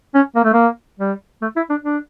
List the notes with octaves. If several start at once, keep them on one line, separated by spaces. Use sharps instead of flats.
C#4
A#3
A3
A#3
G3
A3
E4
D4
D4